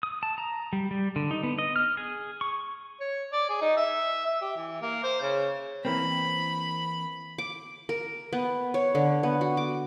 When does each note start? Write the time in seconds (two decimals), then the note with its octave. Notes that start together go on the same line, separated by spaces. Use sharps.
0.03 D#6
0.23 A5
0.38 A#5
0.73 G3
0.91 G3
1.16 D3
1.31 D#4
1.43 B3
1.59 D#5
1.76 F6
1.97 G#4
2.41 C#6
3.00 C#5
3.32 D5
3.49 G#4
3.62 D#4
3.77 E5
4.26 E5
4.42 G4
4.56 E3
4.82 A#3
5.04 C5
5.21 C#3
5.85 E3 A#3 C4 B5
7.38 D6
7.89 A#4
8.33 B3
8.74 C#5
8.95 D3
9.23 B3
9.41 F#4
9.57 D6